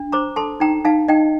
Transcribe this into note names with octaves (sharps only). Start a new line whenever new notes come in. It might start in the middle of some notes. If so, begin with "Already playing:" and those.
Already playing: D4
C5 A#5 D6
A4 A5 C6
D#4 G5 A#5
D#4 F5 A5
D#4 D#5 G5